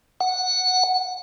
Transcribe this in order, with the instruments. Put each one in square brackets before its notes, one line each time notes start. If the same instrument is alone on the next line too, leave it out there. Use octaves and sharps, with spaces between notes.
[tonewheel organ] F#5